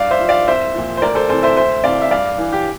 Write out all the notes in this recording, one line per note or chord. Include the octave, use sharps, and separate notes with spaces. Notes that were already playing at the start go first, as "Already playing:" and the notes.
Already playing: G2 D5 F5
C5 E5
F3
D5 F5
C2 C5 E5
A#2 F3
C5
D2 A#4 D5
A4 C5
C3 E3 A4 C5
C5 E5
D2 C5 E5
C3 E3 D5 F5
E5
G2 D5 F5
E3
G4